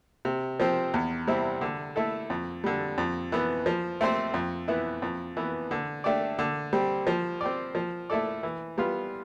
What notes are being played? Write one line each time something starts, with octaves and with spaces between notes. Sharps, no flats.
C3
F3 C4
E2
C3 G3 C4 E4
D3
A3 E4 A4
F2
D3 G3
F2
E3 B3
F3
A3 C4 G4 C5
F2
E3 B3 E4
F2
E3 B3
D3
A3 D4 G4 D5
D3
G3 C4
F3
C4 G4 D5
F3
A3 E4 A4 D5
E3
G3 B3 F4